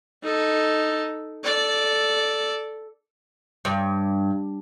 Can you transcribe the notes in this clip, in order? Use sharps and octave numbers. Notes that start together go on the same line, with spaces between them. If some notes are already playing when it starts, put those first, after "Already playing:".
D#4 A4
A4 D5
G2